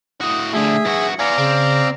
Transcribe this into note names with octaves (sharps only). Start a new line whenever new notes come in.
A2 F#4 D#6
D3 F3 A3 G#4 E5
G2 F#4 C#7
B3 G#4 D5 F5 A#5
C#3 C4